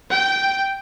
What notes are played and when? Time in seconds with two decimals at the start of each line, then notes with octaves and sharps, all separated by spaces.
0.10 G5